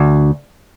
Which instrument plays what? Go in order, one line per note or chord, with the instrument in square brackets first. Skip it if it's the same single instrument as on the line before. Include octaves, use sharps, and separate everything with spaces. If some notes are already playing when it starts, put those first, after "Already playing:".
Already playing: [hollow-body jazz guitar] D2